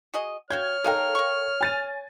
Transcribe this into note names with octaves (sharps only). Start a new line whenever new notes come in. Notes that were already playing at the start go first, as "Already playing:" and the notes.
F#4 G#4 D#5
F#4 C#5 F5 G5 F6 G#6
G#3 D#4 A4 A#4 F5 G5
A#4 C#6
G#5 A6 D#7